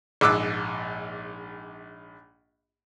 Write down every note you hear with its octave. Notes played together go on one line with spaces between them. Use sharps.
A#1 G#2 D6 E6 F#6